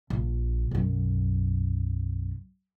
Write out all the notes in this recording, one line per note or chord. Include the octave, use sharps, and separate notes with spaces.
A#1
B1 F#2